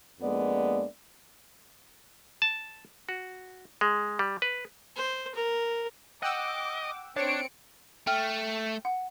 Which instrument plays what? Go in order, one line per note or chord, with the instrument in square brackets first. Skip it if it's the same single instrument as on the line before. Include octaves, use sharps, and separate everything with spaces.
[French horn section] F2 G#3 A#3 B3 D4 D5
[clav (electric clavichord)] A5
F#4
G#3
G3
B4
[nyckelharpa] C5
A#4
[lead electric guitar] D#5 [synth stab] F#5 G5 E6 [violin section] D6
[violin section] C4 C#7 D7 [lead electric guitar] D4 [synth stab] C#5
[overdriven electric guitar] A3 [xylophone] G5 F6
[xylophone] F#5